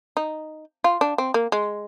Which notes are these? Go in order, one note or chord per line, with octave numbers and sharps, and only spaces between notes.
D#4
F4
D4
C4
A#3
G#3